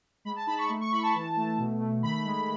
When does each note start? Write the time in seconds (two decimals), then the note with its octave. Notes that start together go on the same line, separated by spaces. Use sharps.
0.25 G#3 B5
0.36 A5
0.47 D#4 B5
0.58 C#6
0.69 A3
0.81 C#6
0.92 E4 B5
1.03 A5
1.14 E3
1.36 A3
1.58 B2
1.80 A3
2.02 D#3 B5
2.25 G#3